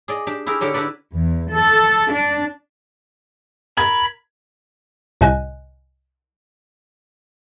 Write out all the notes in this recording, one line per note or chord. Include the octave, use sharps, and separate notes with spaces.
G#4 D5 D#5
D4 G4
E4 G4 G#4 A#4
D3 G4 A#4 C#5
D4 E4 G4 A#4 B4 D5
E2
A4
D4
A#4 B5 G#6
C2 A2 C3 D#5 G#5 F#6